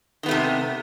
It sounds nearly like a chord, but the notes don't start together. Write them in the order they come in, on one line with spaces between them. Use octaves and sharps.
D#3 B3 A3 C3